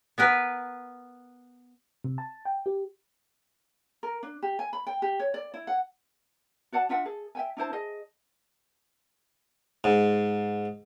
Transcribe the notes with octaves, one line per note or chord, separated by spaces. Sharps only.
B3 A#4 B4
C3
A5
G5
G4
A#4
D4
G4
G#5
B5
G5
G4
C#5
D5
E4
F#5
F#4 D5 F#5 A5
D4 F4 E5 F#5
G#4 A4
E5 G5 G#5
D4 E4 C5 A5
G#4 D#5
G#2